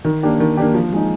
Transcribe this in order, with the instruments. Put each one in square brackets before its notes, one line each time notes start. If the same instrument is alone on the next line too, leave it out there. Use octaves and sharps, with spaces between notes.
[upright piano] D#3
A#3 D4 G4
D#3
A#3 D4 G4
F3
G#3 D#4